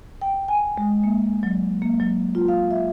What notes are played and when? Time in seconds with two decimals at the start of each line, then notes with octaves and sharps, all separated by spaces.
0.21 G5
0.48 G#5
0.78 G#3
1.04 A#3
1.43 F#3
1.82 A#3
2.00 F#3
2.35 F4
2.48 F5
2.71 E5